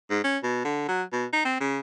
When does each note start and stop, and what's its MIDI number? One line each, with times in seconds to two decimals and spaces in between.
0.10 0.19 44
0.24 0.38 61
0.43 0.64 47
0.65 0.85 50
0.88 1.03 54
1.12 1.26 47
1.33 1.43 63
1.45 1.60 60
1.61 1.80 49